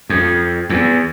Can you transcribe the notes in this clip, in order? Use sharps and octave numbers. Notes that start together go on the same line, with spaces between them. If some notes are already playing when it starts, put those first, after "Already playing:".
F2
E2